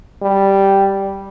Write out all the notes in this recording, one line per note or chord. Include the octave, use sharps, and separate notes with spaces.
G3